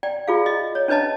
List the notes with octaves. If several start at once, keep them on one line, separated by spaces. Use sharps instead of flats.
D5 G5
F4 G#4 F5
D#5
C#5
C#4 D4 B4 D#5 A5